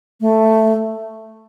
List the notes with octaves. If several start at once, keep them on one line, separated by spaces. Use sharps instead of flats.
A3